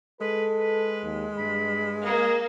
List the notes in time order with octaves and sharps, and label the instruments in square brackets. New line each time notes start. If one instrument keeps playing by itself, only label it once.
[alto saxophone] G#3 [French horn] A4 [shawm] B4
[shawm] B4
[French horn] D#2
[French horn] G2 [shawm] B5
[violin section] A#3 [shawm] G#4